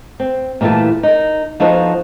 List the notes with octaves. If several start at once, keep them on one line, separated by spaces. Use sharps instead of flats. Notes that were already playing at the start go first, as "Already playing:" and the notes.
C4
A#2 E3 G3 A3 A5
D#4 A#4
F3 B3 D#4 F#4 A4 C5